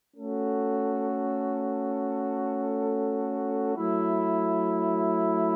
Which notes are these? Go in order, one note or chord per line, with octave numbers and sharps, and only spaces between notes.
A3 C#4 F#4 A4
F#3 A3 E4